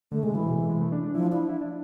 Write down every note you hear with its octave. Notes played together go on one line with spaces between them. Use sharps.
D3 A3
C3 G#3
C3 E3
B2
C3
G#3
A3
D4
D4
F3 E4
D4 E4
E4
D4